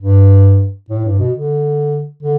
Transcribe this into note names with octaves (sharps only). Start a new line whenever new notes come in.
G2
A2
G2
B2
D3
D3